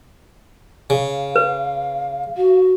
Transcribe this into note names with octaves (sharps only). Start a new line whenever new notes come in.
C#3 F5
B4
F#4